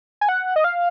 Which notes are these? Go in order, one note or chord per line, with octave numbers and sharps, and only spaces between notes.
G#5
F#5
D#5
F5